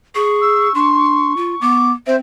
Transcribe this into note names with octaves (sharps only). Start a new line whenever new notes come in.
G#4 C#6
E6
D4 C6
F4
B3 D6
C4 C5 E5